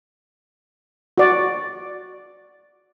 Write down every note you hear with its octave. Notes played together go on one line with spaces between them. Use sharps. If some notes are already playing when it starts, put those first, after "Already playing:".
F#4 D5